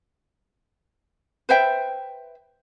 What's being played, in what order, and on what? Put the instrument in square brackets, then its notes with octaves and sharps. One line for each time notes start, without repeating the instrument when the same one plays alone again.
[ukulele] B4 C5 E5 G5